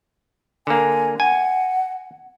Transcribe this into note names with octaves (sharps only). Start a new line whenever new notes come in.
D3 A#3 G#5
F#5 G#5